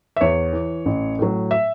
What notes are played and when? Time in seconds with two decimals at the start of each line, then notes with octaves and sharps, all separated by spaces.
0.16 E5
0.21 E2 C#5
0.53 E3
0.86 A1
1.19 A2 F#3
1.51 E5